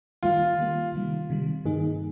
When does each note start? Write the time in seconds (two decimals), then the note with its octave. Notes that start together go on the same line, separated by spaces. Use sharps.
0.23 D#3 G3 A#3 F4
0.58 D#3 G3 A#3
0.94 C3 D#3 G3
1.30 C3 D#3 G3
1.65 G2 D#3 A#3 D#4 G#4